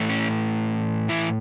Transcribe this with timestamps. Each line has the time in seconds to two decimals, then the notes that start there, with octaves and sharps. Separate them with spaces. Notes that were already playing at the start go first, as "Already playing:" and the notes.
Already playing: A2 E3 A3
0.09 C#4
1.09 E3 E4